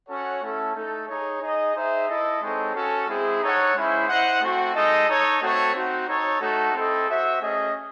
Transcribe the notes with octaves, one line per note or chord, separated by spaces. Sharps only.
C#4 F#4 A4 C#5 F#5
A3 C#4 E4 A4
A3 D#4 A4
D#4 G#4 C#5
D#4 G#4 D#5
D#4 G#4 C5 E5
E4 A4 D#5
G#3 C4 D#4 A4 C#5
C#4 F#4 A4
G#3 C4 E4 G#4
D#4 A4 C#5 F#5
G#3 C#4 E4 C5
E4 C5 D#5 F#5
A3 C4 F#4
G#3 D#4 A4 D#5
D#4 A4 C#5
A3 C4 F#4 A4 C#5
C4 D#4 F#4
D#4 A4 C#5
A3 D#4 F#4 A4
C4 E4 A4 D#5
F#4 C5 E5
A3 C#4 G#4 D#5